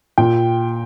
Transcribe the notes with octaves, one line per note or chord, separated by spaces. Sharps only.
A#2 G5